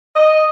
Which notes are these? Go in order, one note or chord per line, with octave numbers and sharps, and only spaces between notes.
D#5